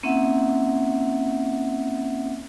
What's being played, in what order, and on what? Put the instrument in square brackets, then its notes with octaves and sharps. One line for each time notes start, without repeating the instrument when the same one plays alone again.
[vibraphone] A#3 C4 C#4 E4 E5 F#5